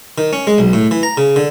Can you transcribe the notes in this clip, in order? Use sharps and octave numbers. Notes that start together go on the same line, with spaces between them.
D#3
C#4
G#3
B1
A2
E3
A#5
C#3
D3